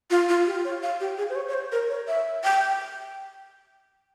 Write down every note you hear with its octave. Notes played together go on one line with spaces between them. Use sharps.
F4
F4
G4
C#5
F5
G4
G#4
C5
C#5
C#5
C5
A#4
C#5
E5
G5